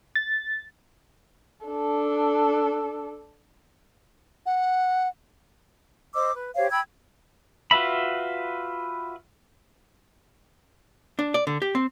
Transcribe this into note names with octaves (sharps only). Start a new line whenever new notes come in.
A6
D4 A4
F#5
C5 D#5 D6 E6
B4
G4 C5 C#5 F5
G5 B5 E6 G#6
F4 F#4 B4 E5 B5
D4
D5
D3
G4
C4